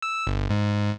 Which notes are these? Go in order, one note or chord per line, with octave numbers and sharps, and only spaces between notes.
E6
G1
G#2